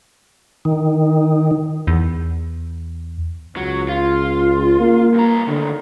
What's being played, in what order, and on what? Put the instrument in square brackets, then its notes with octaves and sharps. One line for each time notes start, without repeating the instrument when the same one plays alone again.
[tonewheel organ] D#3
[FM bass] E2
[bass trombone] C#2 [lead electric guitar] F#3
[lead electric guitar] F4
[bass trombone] A#3
[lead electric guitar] G2 A#5
[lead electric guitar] A2 D#3 [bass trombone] D3